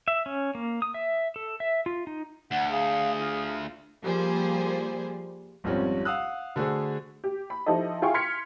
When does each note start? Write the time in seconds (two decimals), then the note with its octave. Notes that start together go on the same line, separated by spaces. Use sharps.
0.08 E5
0.26 C#4
0.55 A#3
0.82 D#6
0.94 E5
1.36 A4
1.60 E5
1.86 F4
2.07 D#4
2.51 D2 F#5
2.71 G#4 F5
3.19 F4
4.03 F3 G3 A#3 G#4 C5
5.64 G#1 F2 F3 G3 C#4
6.05 F5 F#5 D#6 E6 F#6
6.56 D3 A3 F#4 G#4 C5
7.24 G4
7.50 B5
7.66 F3 D#4 E4 G4 A4 D#5
8.02 E4 F4 G#4 F5 G5 C#6
8.14 C6 F6 G#6 B6 C#7